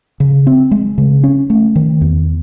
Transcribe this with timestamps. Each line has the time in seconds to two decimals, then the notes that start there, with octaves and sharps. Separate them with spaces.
0.20 C#3
0.47 C4
0.71 G#3
0.98 C#3
1.24 C#4
1.50 A3
1.76 D#3
2.01 E2